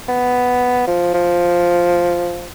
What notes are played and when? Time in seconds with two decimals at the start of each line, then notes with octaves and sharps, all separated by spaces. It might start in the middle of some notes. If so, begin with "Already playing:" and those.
0.09 B3
0.87 F3
1.14 F3